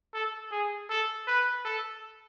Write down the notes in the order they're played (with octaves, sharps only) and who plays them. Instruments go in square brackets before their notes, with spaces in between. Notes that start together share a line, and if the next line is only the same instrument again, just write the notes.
[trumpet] A4
G#4
A4
B4
A4